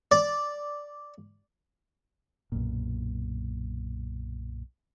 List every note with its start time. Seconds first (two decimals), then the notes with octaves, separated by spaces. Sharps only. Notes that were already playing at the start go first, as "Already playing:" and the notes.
0.11 D5
2.52 B1 F#2 A#2